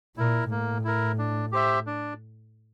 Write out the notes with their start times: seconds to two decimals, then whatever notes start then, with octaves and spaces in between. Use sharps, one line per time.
0.17 A#2 E4 A#4
0.51 A2 A#3
0.85 E4 A#4
1.19 D4
1.52 G4 C5 E5
1.87 D4